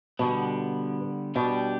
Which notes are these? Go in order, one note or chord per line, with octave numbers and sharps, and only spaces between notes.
B2 D3 G3 B3
B2 G3 D4 G4